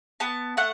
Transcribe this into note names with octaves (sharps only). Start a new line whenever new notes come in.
B3 A5
A3 F#5